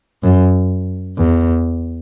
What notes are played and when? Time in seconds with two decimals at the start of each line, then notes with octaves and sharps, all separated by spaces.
0.23 F#2
1.17 E2